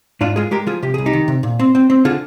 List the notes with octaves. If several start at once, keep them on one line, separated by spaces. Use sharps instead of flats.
G#2 D4 F4
G#3 F4 G#4
G#3 G4 A#4
F3 F4 G#4
C3 G4
C2 G#4
D#4 G4
D#3
C3
A#2
C4
C4
C4
D3 F4 G#4